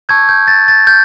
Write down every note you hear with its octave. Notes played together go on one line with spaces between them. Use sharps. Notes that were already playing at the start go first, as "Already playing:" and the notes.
A5 C#6 E6 G6 G#6
G6
A6
A6
G6